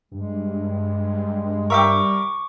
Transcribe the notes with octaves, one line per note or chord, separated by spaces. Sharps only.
G2 G#3
G3 A#4 E5 G5 C#6 D6